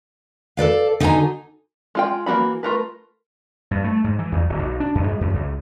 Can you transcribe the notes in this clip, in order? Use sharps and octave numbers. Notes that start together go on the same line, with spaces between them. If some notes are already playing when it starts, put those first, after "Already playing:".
A4 B4 D5 F5
D3 D#4 F#4 E5 G#5 A#5
G#3 F4 G5
E3 A#3 C4 F#4 B5
A3 F4 A#4 B4
G2
A3
G#2
E3
E2
D1
B1
D4
F#2
G#2
F#2
C#2